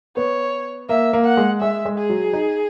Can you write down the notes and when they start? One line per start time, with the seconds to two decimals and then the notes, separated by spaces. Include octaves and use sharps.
0.17 B3 C#5
0.89 A#3 E5
1.13 A#3
1.25 F#5
1.37 G#3
1.61 G#3 E5
1.85 G#3
1.98 G#4
2.10 F#3
2.33 D#4